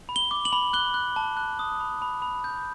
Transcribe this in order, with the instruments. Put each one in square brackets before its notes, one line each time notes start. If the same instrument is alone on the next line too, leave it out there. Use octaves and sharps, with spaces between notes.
[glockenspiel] B5
G7
D6
F#7
B5
F#6 G7
F#6
A5
F#6
D#6
B5
B5
B5
G6